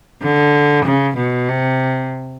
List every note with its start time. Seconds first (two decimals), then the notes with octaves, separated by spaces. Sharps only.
0.22 D3
0.85 C#3
1.17 B2
1.49 C3